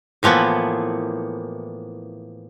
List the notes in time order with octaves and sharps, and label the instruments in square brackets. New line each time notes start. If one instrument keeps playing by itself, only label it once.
[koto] A2 E3 F3 A#3 B3